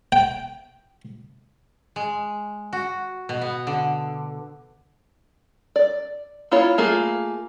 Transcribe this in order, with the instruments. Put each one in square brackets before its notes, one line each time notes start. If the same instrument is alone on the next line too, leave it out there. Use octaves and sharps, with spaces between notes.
[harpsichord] G5
[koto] G#3
F#4
B2
B3
D3
[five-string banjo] D5
A#3 E4 F4 C#5
A3 A#3 F4 G#4